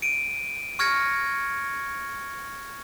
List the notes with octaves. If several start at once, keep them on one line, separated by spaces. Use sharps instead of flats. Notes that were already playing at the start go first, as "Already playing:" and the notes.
D7 D#7
C#6 F6 G#6 A#6 C#7